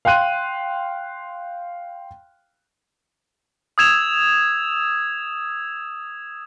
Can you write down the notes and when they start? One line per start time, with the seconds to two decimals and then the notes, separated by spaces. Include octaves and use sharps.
0.05 F5 G5 C6 F#6 D#7
3.78 D#6 E6 G#6 E7 F7